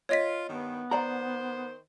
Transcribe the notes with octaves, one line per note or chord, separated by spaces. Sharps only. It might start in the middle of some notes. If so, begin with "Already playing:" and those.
F4 C#5 D#5 B6
G2 D#3 B3
D#3 C5 D5 F#5 A#5